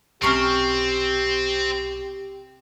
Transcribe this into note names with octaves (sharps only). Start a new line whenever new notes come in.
B1 C3 C4 C#4 G4 A#4 C#6 C7